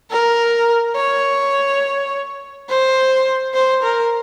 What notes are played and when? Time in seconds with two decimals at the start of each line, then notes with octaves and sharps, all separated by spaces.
0.11 A#4
0.96 C#5
2.69 C5
3.54 C5
3.83 A#4